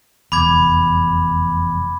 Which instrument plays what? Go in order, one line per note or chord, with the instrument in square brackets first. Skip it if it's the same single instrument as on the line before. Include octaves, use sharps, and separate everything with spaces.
[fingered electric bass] F1 E2 [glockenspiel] B5 D6 G#6